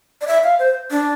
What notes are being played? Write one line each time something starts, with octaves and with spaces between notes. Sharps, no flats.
D5
E5
F5
C5
D4